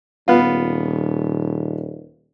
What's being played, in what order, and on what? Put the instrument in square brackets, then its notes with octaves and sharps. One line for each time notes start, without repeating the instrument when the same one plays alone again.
[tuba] D#1 [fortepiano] B3 F4